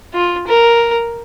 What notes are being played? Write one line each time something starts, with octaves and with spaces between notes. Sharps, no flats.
F4
A#4